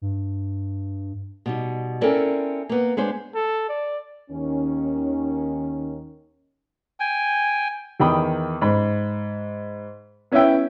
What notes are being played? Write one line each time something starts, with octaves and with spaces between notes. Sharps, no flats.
G2
B2 G3 D#4
C4 C#4 E4 A4 A#4 D5
A#3 B3
G#3 B3 D4 C5
A4
D5
D#2 D#3 C#4
G5 G#5
E2 D#3 G5 B5 D#6
G#2 B5
B3 C#4 E4 B4 E5 G5